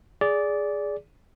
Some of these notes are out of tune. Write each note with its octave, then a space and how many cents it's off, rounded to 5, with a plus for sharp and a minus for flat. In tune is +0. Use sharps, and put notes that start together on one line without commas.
G#4 +0 D5 -15